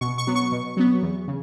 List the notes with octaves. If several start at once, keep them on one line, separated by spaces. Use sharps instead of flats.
B2 C#6
C#6
F#3 B3
C#6
B2
F#3 B3
E2
C#3